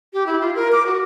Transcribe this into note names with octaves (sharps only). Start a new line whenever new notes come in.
G4
E4
F4
A#4
D6
F#4